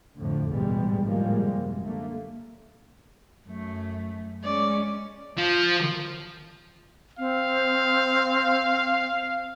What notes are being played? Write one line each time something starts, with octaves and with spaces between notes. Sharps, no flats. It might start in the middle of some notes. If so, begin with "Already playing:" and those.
F2 A2 D3
A1 E2 G#2 B2 G3 G#3
A2 D#3 F3 G3 G#3 A#3
F#2 C3
D3 A3 A#3
F#2 A3
G#3 C#4 D5
F3
C4 F5